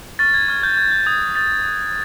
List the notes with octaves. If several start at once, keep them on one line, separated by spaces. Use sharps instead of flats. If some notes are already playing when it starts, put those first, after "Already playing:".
C#6 F6 A6
G#6
C#6 F6 G#6
G6
C#6 F6 G#6
G6
D#6 G6 G#6
D#6 G6 A6
D#6 F#6